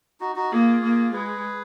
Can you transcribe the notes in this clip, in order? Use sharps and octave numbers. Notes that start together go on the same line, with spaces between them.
D#4 F#4
D#4 F#4
A#3 F4 G#4
A#3
G#3 G#4 B4